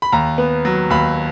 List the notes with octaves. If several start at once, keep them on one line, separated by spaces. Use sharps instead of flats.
B5
D#2 A#5
B3
F#3
D#2 B5